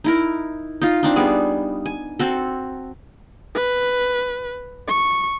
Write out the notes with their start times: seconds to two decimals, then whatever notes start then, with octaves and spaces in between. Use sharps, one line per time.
0.04 D#4 E4 A#4
0.82 D#4 F4
1.03 C4 D4 D#4
1.16 G3 B3 G#4
1.86 G#5
2.19 C4 F#4 A4
3.55 B4
4.88 C#6